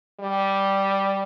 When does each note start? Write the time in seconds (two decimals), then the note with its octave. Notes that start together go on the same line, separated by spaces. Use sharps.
0.20 G3